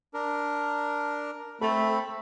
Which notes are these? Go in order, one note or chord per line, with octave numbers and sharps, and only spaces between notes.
D4 A#4
A3 C4 A4 B5